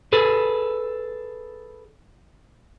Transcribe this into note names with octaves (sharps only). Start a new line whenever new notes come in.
G#4 A4 B4